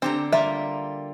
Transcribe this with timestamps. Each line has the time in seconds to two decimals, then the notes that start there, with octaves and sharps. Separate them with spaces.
0.02 D3 C4 G4 A#5
0.32 G3 A#3 F4 E5